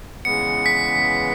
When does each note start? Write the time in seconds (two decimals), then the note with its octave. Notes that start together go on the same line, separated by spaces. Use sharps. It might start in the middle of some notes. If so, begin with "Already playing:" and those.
0.25 C#3 E3 G#3 B3 C#7
0.66 B6